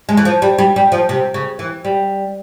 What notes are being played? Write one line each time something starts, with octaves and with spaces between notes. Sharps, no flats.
G#3
E3
F3
G3
G3
G3
F3
C3
C#3
E3
G3